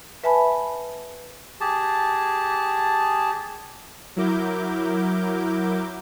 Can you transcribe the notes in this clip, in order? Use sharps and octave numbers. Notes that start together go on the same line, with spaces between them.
B4 E5 G#5 A5 B5
G4 G#4 A5
F#3 E4 A#4 D6 G6